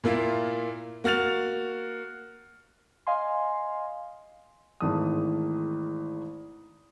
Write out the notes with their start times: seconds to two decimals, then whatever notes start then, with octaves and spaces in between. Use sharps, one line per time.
0.04 A#2 A#3 E4 F4
1.04 A#3 F#4 F6 A6 F7
3.07 D#5 F5 G#5 C6
4.80 G#1 D#3 E3 A3 A5 D#6